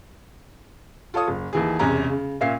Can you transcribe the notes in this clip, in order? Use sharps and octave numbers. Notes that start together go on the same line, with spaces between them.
F4 A4 C#5 D#6
F#1
D#2 E3 G#4
E1 E2 C3 C#4 A#5
C#3
A#2 C#4 E5 F5 C7